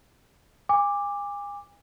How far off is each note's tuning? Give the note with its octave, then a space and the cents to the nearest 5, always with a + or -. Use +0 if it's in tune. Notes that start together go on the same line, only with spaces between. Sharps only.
G#5 -35 D6 +5